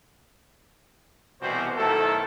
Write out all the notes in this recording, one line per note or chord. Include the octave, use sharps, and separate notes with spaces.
C2 B2 E3 G3 F#4 C5
B1 D#3 A3 E4 A4